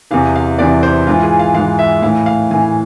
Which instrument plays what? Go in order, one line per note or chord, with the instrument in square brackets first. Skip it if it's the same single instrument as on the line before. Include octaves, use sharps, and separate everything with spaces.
[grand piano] E2 C3 E3 F5
F5
E2 C3 E3 D5
C5
G#2 E3 F4
G#4
F5
G#2 E3 F5
E5
A2 E3 F5
F5
A2 E3 G#5